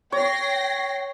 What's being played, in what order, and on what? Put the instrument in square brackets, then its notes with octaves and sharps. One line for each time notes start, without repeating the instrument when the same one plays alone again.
[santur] C#5 [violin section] G5 A#6 C7